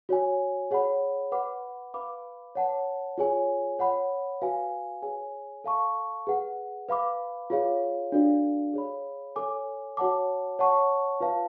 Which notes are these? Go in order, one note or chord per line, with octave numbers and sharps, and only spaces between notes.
F#4 C#5 G#5
G#4 C#5 F#5 B5
B4 F#5 B5 D6
B4 F5 B5 D6
C#5 F#5 A5
F4 G#4 C#5 G#5
C#5 F#5 B5
F#4 B4 F5 G#5
G#4 C#5 G#5
A4 F5 A5 C#6
G#4 B4 F#5
B4 F5 B5 D6
F4 G#4 C#5 F5
D4 F#4 A4 D5 F5
G#4 C#5 F5 B5
A4 C#5 G#5 D6
F#4 C#5 F#5 A5 D6
C#5 F#5 A5 C#6
F4 B4 F5 A5